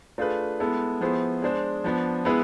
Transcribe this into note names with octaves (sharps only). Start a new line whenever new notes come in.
A3 D4 F4 G#4 B4
G#3 B3 E4 A4
F3 B3 E4 G#4 C5
G#3 D4 G#4 C5
F3 B3 D4
G#3 B3 E4 G#4 B4